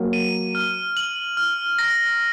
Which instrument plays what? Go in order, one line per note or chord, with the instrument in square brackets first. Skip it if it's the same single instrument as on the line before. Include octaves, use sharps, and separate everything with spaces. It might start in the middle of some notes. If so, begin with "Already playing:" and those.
Already playing: [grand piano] F#3 A#3
[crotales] D#7
F6
F#7
F6
A#6